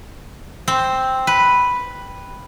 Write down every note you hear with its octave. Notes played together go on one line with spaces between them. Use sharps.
C4
B4